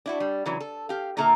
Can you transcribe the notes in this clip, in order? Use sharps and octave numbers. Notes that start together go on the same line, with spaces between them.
D4 E4 F#4
G3
C#3 E3 F#3
A4
G4 F5
A#2 D3 A#3 A4 E5 A#5